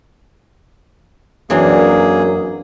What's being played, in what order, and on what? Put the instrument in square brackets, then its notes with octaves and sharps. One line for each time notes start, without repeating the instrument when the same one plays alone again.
[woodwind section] F#2 [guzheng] E3 C4 D4 [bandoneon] A#3 G#4